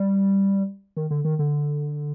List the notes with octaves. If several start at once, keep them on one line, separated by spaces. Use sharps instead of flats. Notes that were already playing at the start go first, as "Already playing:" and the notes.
Already playing: G3
D#3
D3
D#3
D3